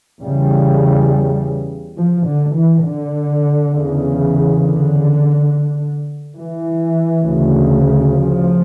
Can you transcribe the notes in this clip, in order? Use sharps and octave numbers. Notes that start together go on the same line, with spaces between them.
E2 C#3 G3
F3
D3
E3
D3
E2 C#3
D3
E3
D2 C#3
F3